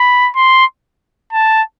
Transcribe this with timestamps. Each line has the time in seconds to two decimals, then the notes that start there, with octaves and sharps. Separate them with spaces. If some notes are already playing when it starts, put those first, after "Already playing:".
Already playing: B5
0.36 C6
1.33 A5